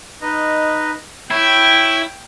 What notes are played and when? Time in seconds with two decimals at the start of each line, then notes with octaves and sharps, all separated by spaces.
0.22 D#4 B4 D#5
1.31 E4 C#5 G5